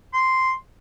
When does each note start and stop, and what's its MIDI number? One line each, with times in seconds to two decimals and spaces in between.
0.14 0.53 84